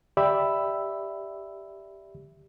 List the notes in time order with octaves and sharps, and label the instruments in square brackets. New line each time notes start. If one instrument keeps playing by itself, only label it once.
[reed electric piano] G4 D5 E5 B5 E6